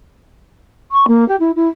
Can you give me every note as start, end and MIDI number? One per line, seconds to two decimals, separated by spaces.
0.91 1.05 85
1.07 1.27 58
1.28 1.36 67
1.40 1.51 64
1.56 1.68 64